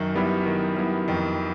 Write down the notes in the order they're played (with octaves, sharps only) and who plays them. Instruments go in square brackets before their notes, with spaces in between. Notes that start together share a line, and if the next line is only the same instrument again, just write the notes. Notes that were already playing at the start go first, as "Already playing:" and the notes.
Already playing: [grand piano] F#2 [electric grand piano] D#3
[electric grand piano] G3 B3 E4
D#3
G3 B3 E4
[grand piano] F2 [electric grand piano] D#3